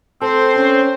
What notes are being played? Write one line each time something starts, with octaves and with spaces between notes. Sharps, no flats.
C4 A4 C5
C#4 G#4